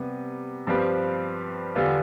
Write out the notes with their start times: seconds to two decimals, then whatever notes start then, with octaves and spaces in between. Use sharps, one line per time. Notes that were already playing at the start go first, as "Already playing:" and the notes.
Already playing: C3 G3 B3
0.67 G2 F3 C4 G4 B4
1.75 E2 D3 G3 B3 F4